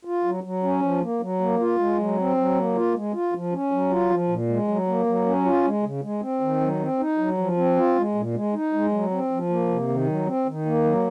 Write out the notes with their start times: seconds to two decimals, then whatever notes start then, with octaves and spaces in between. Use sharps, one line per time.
0.05 F4
0.24 F#3
0.44 F#3
0.63 C#4
0.82 F3
1.01 A#3
1.20 F#3
1.41 A#3
1.59 F4
1.79 G#3
1.97 F#3
2.17 C4
2.37 F#3
2.55 A#3
2.75 F4
2.95 G#3
3.13 F4
3.33 F3
3.52 C#4
3.72 F#3
3.91 F4
4.10 F3
4.29 A#2
4.48 G#3
4.68 F#3
4.87 A#3
5.06 F#3
5.26 C#4
5.45 F4
5.64 G#3
5.83 C#3
6.03 G#3
6.21 C4
6.41 D#3
6.61 F#3
6.80 C4
6.99 D#4
7.18 F#3
7.38 F3
7.57 C4
7.77 F4
7.96 G#3
8.15 A#2
8.34 G#3
8.54 D#4
8.73 G#3
8.92 F#3
9.11 C4
9.31 F3
9.49 A#3
9.68 C3
9.88 D#3
10.07 F#3
10.26 C4
10.46 D#3
10.66 A#3
10.84 F#3